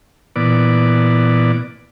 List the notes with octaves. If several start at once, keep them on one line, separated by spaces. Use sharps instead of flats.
A#2 E3 B3 D5